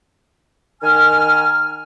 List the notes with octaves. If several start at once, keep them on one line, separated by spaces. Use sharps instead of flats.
D#3 G#5 F6